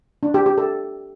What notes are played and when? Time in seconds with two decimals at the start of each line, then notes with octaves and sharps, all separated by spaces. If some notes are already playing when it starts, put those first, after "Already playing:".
0.23 D4
0.34 G4
0.46 G4
0.58 A4